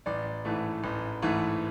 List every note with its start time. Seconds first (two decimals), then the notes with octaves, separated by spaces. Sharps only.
0.06 A1 D5
0.45 G#2 E3 A3
0.84 A1
1.22 G#2 E3 A3